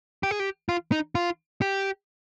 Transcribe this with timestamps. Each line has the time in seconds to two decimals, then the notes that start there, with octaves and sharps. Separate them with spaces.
0.23 G4
0.31 G#4
0.40 G4
0.69 F4
0.92 D#4
1.15 F4
1.62 G4